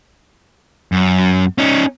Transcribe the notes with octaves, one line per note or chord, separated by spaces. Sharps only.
F#2
C#4 D#4